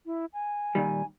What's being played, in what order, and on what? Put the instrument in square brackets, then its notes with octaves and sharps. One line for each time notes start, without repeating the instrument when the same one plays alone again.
[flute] E4
G#5
[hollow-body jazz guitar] A#2 D#3 G3